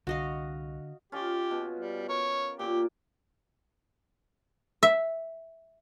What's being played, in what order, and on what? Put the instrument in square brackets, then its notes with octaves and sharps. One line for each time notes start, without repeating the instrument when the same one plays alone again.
[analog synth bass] C2 [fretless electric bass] D3 [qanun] F#4 D#5 F5
[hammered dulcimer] C#4 F4 D#5 [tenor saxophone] G4
[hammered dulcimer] B2
[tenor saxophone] G3
[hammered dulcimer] A#4 [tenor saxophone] C#5
[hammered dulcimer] A#2 D6 [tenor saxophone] G4
[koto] E5